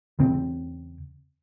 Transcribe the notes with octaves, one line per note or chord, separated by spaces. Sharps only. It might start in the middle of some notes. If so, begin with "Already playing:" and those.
E2 C#3 C4